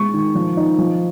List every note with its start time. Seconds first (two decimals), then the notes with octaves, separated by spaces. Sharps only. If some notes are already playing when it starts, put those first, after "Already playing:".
Already playing: G#3 C#6
0.14 D#3
0.35 F3
0.57 D#4
0.78 F3